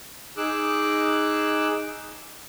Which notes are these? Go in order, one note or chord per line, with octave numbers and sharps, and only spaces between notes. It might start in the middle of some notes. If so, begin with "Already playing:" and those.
D#4 G#4 D6 E6 F#6